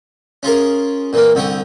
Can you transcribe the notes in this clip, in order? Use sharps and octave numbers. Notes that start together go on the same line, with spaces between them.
C#4 F4 G#4 A#4
A#2 E3 A#3
C2 D3 G4 C#6 D#6